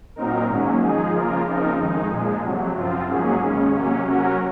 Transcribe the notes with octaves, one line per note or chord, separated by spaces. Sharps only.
A#2 F#3 C4 D#4 A#4
G#2 D#3 F#3 A#3 C#4
F3 G#3 D#4 G#4
C#3 F3 A#3 F4 A#4
C#3 F3 C4 D#4 A#4
F2 D#3 G#3 D#4
A#2 F3 G#3
F2 C3 F#3
F#2 F3 C4 F4
G#2 F#3 A#3 C#4 G#4
D#2 C#3 G#3 C#4
C3 F#3 A#3 C#4
C3 F#3 C#4 F#4 A#4